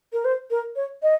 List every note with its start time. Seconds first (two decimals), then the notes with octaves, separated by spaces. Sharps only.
0.13 A#4
0.25 C5
0.51 A#4
0.76 C#5
1.02 D#5